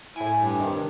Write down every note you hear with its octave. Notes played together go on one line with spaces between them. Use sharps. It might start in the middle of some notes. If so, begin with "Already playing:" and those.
A2 E4 G#5
G2
C2 D#3